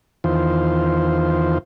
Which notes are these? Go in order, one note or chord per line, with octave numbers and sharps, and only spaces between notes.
E2 D#3 F4 C5